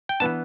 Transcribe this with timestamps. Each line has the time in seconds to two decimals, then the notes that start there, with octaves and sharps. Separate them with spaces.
0.09 G5
0.20 E3 B3 D4 A5